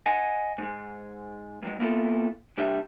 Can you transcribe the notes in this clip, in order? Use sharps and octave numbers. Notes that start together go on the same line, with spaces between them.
D#5 F#5 G#5
G#2 G#3
G2 F#3 G#3
A#3 B3 E4 F4 G#4 A4
C3 G3 D4 G4 E5